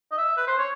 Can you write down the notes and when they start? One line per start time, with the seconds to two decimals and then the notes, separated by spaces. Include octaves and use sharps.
0.12 D#5
0.18 E5
0.37 B4
0.47 C5
0.58 C#5